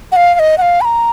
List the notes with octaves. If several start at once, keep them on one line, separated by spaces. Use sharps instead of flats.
F#5
F5
F5
D#5
F#5
F5
B5
A#5